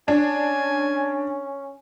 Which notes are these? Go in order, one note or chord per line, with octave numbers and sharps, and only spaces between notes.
C#4 D4 G#5